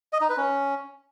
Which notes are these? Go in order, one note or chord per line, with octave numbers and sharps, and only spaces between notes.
D#5
D#4
B4
C#4